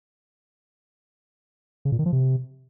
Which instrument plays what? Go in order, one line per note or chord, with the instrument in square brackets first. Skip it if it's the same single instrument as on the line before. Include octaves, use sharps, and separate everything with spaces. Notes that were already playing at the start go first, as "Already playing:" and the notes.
[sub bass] C#3
A#2
D#3
F3
C3